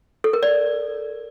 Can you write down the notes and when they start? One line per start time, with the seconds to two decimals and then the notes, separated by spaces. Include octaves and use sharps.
0.24 A4
0.33 A#4
0.43 D5